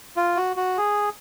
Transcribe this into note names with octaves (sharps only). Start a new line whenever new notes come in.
F4
F#4
F#4
G#4